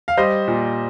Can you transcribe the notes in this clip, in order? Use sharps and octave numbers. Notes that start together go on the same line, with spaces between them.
F5
G3 C5 D#5
A#2